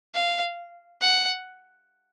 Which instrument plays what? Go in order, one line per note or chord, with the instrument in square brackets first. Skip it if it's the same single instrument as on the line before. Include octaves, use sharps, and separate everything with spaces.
[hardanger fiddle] F5
F#5